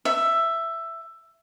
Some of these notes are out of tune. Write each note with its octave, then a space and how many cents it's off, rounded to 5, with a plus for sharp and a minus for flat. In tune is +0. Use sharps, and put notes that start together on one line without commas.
E5 +10